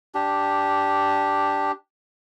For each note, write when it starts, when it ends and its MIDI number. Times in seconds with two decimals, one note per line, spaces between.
0.15 1.72 62
0.15 1.72 67